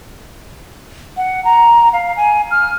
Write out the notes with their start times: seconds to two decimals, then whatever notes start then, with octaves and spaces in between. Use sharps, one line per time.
1.17 F#5
1.45 A#5
1.93 F5
2.16 G#5
2.51 F6